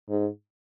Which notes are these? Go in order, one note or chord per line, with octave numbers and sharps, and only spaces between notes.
G#2